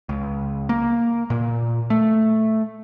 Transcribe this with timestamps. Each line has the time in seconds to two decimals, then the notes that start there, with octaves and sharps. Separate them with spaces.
0.09 C#2
0.69 A#3
1.30 A#2
1.90 A3